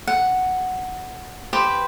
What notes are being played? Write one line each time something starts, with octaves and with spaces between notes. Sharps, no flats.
F#5
G4 B4 C5